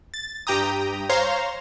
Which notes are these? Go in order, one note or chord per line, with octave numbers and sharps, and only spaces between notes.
A6
G2 G4 G5 A#5 D#6
C5 C#5 F5 A#5 C6